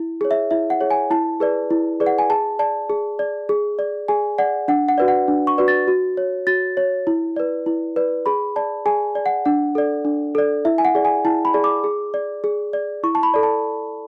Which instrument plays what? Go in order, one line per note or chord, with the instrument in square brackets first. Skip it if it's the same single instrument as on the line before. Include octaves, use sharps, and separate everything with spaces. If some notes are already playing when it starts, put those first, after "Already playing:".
Already playing: [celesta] E4
G#4 C#5
E5
E4 E5
F#5
G#4 C#5
G#5
E4 A5
G#4 B4 D5
E4
G#4 B4 D5
F#5
G#5
G#4 A5
D5 A5
G#4
D5
G#4
D5
G#4 G#5
D5 F#5
D4 F#5
F#5
F#4 B4 D5
F#5
D4
C#6
F#4 B4 D5
A6
F#4
C#5
F#4 A6
C#5
E4
B4 D5
E4
B4 D5
G#4 B5
D5 A5
G#4 G#5
D5
F#5
D4 F#5
A4 D5
D4
A4 D5
E4 E5
G#5
F#5
G#4 D5
G#5
E4 A5
B5
G#4 D5
D6
G#4
D5
G#4
D5
E4 C#6
A5
B5
A4 D5
A5